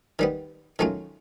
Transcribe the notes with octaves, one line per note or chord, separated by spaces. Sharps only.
D#3 G3 B3
D#3 F#3 A3 C#4 F4